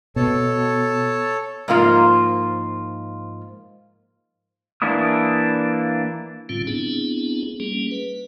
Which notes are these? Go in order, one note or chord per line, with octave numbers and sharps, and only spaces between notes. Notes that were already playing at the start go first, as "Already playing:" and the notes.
B2 A4 C#5 A5
G#2 F3 A#3 F4
E3 A#3 D4 E4 D#6
A2 D3 G3 C4 C#4 F4
B3 C4 D4 E4 G#4
G3 A#3 C#4 G#4
B4